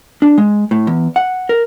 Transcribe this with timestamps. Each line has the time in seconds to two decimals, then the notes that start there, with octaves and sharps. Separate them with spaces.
0.22 D4
0.38 G#3
0.71 A2
0.87 E2
1.16 F#5
1.49 A#4